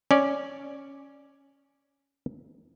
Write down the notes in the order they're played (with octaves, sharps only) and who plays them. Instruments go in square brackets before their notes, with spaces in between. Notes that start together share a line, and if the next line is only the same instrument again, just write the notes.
[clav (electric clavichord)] C#4 D5